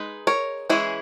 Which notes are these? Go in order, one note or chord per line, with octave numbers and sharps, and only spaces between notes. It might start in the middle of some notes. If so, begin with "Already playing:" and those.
Already playing: G#3 D#4 B4
A#4 C#5
E3 G#3 C#4 E4 G#4